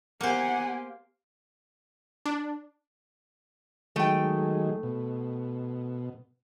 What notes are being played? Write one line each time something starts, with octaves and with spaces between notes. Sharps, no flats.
A#3 B3 G4 C5 F#5 G#5
D4
D#3 F#3 G#3 A3 G5
B2